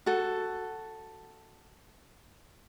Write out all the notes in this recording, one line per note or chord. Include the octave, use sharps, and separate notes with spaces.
F#4 A4